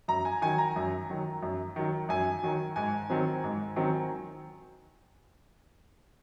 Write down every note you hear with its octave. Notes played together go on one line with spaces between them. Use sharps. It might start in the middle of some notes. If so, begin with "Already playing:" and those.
F#2 A#5
G#5
D#3 F#3 G#5
A#5
F#2
D#3 F#3
F#2
D#3 F#3
F#2 G#5
D#3 F#3
G#2 G#5
D#3 F#3 C4
G#2
D#3 F#3 C4